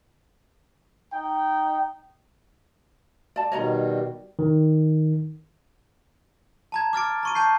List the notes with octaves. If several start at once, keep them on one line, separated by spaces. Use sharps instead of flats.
D#4 G5
D5 A5
B2 D#3 G3 C#5 D#5 A#5
D#3
A5 A#5 G#6
D6 F6 A6 D7
A#5 C#6 D#7
A5 G6 C7